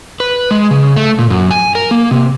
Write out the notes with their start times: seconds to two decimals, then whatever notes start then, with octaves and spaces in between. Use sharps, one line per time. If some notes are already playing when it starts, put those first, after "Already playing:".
0.20 B4
0.51 G#3
0.71 C#3
0.97 A3
1.19 A#2
1.30 F#2
1.51 G#5
1.75 A#4
1.91 A#3
2.11 C3